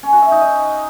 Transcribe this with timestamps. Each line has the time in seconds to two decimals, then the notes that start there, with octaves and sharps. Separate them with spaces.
0.03 C#4
0.13 F#4
0.22 E5
0.31 D#4
0.41 D#5